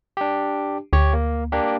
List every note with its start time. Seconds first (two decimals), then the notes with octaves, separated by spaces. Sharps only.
0.17 D4 G4
0.93 D2 G4 C#5
1.13 A#3
1.52 A#3 D4 G4